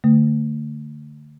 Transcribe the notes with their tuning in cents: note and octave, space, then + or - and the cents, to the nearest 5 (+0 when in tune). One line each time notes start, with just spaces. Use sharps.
D3 +0 A3 +35